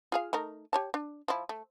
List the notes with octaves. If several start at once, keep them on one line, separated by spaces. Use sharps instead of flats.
F4 G#4 F5
A3 D#4 A#4
G4 C#5 A5
D4
F3 E4
A3